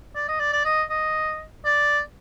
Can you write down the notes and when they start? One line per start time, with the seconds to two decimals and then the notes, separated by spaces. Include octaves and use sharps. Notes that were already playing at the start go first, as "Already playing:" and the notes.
0.16 D5
0.28 D#5
0.40 D5
0.53 D5
0.65 D#5
0.90 D#5
1.65 D5